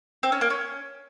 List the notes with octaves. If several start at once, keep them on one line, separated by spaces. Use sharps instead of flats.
C4
C#4
A#3
C#4